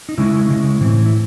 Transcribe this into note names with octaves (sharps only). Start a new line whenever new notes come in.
D#4
C#3 G#3 C#4 E4
C#3 G#3 C#4
A2 E3 C4
E4